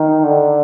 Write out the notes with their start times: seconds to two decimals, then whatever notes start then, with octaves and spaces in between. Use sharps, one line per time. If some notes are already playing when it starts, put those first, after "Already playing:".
Already playing: D#3
0.24 D3